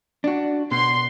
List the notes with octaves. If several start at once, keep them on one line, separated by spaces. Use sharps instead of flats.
D4 F#4
B2 C6